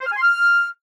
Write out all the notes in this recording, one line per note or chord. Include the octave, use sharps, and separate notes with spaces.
C5
F6
G#5
C6
F6